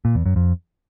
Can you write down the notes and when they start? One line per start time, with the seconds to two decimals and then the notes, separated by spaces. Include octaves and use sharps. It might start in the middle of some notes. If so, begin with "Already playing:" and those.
0.05 A#2
0.15 E2
0.26 F#2
0.36 F2